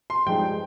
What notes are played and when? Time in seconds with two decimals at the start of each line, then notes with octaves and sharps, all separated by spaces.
0.10 C6
0.26 G2 F3 G#3 D#4 G5